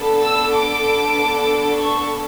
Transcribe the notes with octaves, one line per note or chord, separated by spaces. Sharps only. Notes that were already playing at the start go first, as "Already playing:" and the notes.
Already playing: B3 D4 A4
E6
D6
C#6